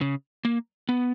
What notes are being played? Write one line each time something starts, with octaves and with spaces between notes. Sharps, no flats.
C#3
A#3
B3